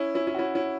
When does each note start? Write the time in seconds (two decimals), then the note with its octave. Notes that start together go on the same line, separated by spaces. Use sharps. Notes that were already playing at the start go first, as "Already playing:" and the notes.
Already playing: C#4 E4
0.15 C#4 E4
0.27 C#4 E4
0.34 F#4
0.39 C#4 E4
0.55 C#4 E4